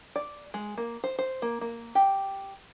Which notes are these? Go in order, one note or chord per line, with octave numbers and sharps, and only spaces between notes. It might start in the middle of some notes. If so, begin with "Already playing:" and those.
D5
G#3
A#3
C5
C5
A#3
A#3
G4